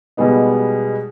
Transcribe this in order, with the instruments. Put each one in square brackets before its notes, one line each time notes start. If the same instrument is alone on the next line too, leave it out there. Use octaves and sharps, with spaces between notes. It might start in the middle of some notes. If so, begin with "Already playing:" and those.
[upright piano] B2 G3 G#3 B3 D#4